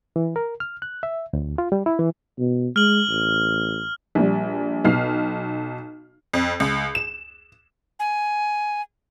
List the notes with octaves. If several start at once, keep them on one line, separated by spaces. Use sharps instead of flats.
E3
A#4
F6
F#6
E5
D2
F4
G3
E4
E3
B2
G#3 F6 F#7
A1
A#1 G3
B1 F6 C7
F2
C#2
E7
G#5